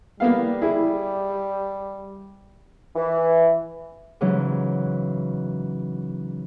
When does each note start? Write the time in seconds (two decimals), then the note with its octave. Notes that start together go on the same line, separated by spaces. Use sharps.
0.20 G3 A#3 B3 F5
0.62 E4 G#4
2.96 E3
4.21 G#2 C#3 E3 F#3 C#4